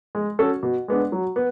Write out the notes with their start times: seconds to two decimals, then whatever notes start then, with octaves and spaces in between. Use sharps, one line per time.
0.15 G#3
0.39 C#4 F#4 A4
0.63 B2
0.88 G#3 B3 D4
1.12 F#3
1.36 B3